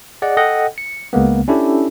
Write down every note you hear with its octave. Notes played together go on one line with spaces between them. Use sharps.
G#4 D5 D#5 F#5
A4 D#5 F#5 G5
C#7
C#2 C#3 G#3 A#3 B3
C#4 D4 E4 G4 A4